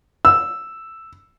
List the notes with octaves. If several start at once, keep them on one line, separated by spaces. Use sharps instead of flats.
E6